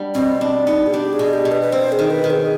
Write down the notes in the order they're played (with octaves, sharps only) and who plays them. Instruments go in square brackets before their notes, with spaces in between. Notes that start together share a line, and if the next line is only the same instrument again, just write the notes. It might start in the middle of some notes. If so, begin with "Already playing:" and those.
Already playing: [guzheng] G3 B3 D4
[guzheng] B2 [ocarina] C4
[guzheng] D4
[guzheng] B3 [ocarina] D#4
[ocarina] G#4
[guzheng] D4 [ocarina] G4
[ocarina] G#4
[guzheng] B2
[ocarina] G4
[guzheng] B2
[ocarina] B4
B4
[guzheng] C4 [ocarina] C5
[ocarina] G#4
[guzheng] D#3
[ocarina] B4
[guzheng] D#3
[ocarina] G#4